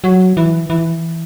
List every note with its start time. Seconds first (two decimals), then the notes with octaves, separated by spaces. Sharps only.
0.04 F#3
0.37 E3
0.70 E3